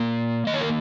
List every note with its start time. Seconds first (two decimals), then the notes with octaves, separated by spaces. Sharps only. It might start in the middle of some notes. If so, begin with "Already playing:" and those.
Already playing: A#2 A#3
0.47 D#3 A#3 D#5
0.54 C#5
0.61 A#4